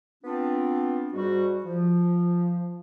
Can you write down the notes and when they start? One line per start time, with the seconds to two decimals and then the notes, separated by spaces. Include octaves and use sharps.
0.24 B3 C4 D4 F4
1.13 G#2 G3 F#4
1.65 F3